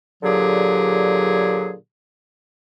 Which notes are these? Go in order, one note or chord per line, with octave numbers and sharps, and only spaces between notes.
A#2 D3 F#3 G4 G#4